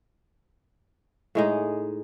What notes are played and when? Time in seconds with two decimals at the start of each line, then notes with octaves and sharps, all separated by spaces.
1.35 A2 G#3 D#4